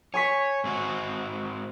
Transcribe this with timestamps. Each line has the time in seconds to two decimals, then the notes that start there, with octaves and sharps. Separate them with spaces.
0.14 C#5 G#5 C#6 B6
0.64 G#2 C4 F#4